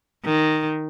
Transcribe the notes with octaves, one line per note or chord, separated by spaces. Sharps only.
D#3